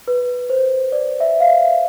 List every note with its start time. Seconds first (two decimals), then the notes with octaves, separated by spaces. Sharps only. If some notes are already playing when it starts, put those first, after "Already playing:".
0.08 B4
0.50 C5
0.92 D5
1.20 E5
1.40 F5
1.48 E5